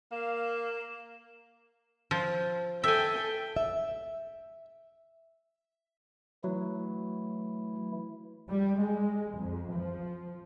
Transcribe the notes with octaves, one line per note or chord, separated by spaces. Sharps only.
A#3 F5 E7
F3
A4 E5 G5 G#5
E5
E3 F#3 A3 E4
G3
G#3
F2
F3